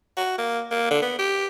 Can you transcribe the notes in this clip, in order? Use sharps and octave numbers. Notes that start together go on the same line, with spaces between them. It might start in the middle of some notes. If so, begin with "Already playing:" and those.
F#4
A#3
A#3
D3
B3
G4